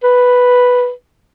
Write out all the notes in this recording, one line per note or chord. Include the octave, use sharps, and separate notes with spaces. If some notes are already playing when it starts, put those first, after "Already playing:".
B4